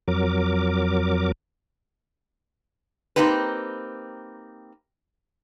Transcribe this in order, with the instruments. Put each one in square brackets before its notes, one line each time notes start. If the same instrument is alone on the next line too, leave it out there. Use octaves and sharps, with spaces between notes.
[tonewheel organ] F2 F#3 A#4 D6
[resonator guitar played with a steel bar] A#3 C4 D#4 G4 B4